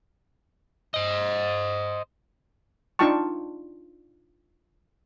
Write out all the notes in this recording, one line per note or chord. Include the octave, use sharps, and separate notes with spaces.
C5 D#5
D4 D#4 F4 G5 A5 C#6